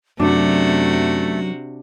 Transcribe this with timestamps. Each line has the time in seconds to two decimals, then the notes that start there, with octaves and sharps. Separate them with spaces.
0.19 F#2 C3 A3 D4 F#4